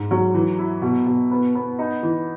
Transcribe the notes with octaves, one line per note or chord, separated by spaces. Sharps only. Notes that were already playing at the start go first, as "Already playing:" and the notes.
Already playing: G#2
F#3
E3
E4
B2
B2
B3
B3
D#4
E3